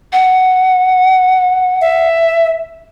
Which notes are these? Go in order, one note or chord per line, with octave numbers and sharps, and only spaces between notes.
F#5
E5